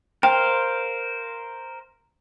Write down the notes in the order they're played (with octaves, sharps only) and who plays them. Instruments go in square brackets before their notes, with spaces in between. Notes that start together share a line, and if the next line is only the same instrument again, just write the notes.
[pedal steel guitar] A#4 C5 F5 [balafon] G5